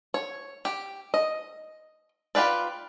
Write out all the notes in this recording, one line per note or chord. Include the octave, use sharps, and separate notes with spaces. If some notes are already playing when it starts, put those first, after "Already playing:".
C#5
G4
D#5
F4 G4 B4 D5